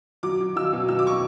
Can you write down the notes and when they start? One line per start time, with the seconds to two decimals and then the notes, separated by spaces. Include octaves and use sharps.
0.23 F#3 D6
0.40 F#3
0.56 F#3 E6
0.73 B2
0.88 F#3 E6
0.99 D6
1.07 C#6